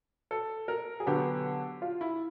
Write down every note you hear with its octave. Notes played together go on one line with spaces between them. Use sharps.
A4
A#4
G#4
D3 F#3 B3 G4
F4
E4